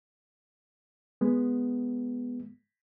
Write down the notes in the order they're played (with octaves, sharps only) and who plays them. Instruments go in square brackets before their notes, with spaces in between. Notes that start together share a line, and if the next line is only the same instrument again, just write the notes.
[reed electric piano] G#3 B3